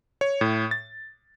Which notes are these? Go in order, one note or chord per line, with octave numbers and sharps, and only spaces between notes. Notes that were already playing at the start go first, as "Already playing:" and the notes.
C#5
A2
A6